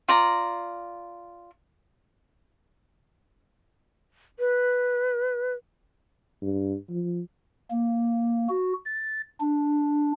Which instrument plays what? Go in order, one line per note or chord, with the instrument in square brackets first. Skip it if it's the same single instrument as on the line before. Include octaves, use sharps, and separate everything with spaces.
[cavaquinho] F4 D5 A#5
[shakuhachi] B4
[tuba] G2
F3
[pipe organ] A#3
F#4
A6
D4